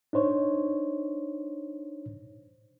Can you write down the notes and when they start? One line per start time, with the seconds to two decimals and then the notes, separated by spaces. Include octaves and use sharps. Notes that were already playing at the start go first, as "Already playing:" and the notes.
0.13 D4 D#4 C5 C#5